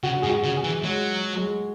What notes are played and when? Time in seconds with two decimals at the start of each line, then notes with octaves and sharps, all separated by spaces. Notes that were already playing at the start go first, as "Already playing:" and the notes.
0.03 C#3 F#4
0.22 G#2 G#4
0.29 F#4
0.44 C#3
0.57 G#4
0.64 E3
0.83 F#3 G#3
1.37 G#3